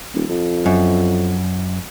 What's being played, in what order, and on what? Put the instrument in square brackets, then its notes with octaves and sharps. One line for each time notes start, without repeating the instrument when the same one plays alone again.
[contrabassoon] D#1
F2
[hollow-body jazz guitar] F#2